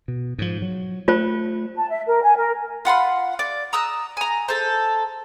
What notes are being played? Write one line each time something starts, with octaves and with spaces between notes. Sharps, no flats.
B2
G#2 F3
F#3
A3 F4 C5
A5
E5
A#4
G#5
A#4
F4 F#5 B5 C6
D5
A#5 D#6 E6 F#6
G#5 A#5
A4 C5